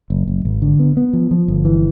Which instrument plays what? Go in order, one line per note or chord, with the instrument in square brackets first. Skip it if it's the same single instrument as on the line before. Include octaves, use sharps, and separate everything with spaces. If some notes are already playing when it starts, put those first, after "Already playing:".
[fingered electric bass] F#1
F#1
G#1
D3
B3
B3
F3
F3
G1
E3